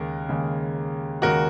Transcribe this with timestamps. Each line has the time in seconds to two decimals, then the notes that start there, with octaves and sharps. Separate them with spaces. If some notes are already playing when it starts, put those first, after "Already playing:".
Already playing: D#2 C#3 G#3 A#4
0.29 D#2 C#3 G#3
1.22 D#2 C#3 G#3 F#4 A#4